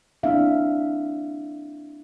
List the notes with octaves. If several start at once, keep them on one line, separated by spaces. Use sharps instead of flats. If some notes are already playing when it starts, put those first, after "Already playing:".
A#3 C4 D4 E4 E5 F5